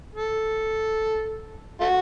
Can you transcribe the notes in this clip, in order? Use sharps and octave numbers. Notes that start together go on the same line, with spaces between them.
A4
A3 F#4